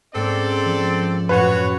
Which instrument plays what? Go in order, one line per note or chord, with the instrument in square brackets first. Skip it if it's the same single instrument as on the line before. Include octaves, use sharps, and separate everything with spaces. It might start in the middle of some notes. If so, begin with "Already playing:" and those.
[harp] G#2 A#3 C#4 [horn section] C4 A4 D5
[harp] F3 C#7
[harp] F#2 A2 [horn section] F#4 C#5 [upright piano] B4